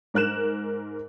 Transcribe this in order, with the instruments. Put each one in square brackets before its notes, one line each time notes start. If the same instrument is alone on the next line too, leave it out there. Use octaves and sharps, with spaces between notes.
[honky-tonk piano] G#2 A#4 F#6 E7